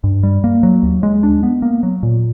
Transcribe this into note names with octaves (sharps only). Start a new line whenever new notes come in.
G2
G3
A#3
F#3
D#2
G#3
D4
B3
A#3
F#3
A#2